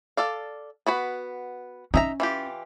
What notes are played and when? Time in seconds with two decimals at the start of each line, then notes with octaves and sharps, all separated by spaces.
0.17 A4 D5 F5
0.86 B3 F#4 B4
1.94 C#4 D#4 E5 A#5
2.20 E3 F4 G4